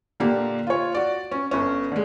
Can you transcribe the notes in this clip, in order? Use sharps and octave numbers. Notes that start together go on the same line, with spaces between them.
A#2 D3 A#3 G4
F4 C#5
F#4 D5
C#4
G1 C#4
D3 G#3